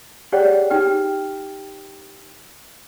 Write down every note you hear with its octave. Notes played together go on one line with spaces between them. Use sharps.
G4 G#4 C#5 D5 F#5 G5
D#4 G4 G5 F6